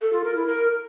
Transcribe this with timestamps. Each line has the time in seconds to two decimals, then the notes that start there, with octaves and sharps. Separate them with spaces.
0.02 A4
0.13 F4
0.24 A#4
0.35 E4
0.47 A#4